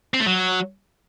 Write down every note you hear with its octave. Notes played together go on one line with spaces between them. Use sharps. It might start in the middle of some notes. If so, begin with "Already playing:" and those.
C4
A3
F#3